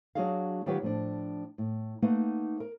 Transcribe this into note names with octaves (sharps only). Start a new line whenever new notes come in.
F#3 D4 F#4 G#4 D#5 F5
D#3 F#3 F4 G4 B4 C#5
A2 F3 D4
A2
A3 A#3 D#4 B4 F5 F#5
A#4